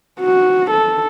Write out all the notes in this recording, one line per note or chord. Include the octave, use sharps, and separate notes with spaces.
F#4
A4